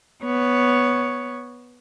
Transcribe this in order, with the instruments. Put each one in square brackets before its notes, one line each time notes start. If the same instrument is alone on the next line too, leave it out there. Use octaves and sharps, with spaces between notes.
[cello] B3 C#5